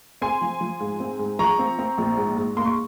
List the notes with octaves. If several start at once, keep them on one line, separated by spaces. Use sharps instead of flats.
C4 G#5 C6
F3
F3
G#2
C4
G#2
F3 A#5 C#6
C4
C4
A#1
G#2
G#2
A#3 C6
C#6